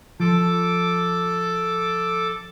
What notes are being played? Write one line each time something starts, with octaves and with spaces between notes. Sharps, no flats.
F3 A4 D6